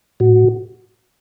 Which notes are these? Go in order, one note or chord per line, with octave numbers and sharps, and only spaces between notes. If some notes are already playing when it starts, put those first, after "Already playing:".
A2 F#4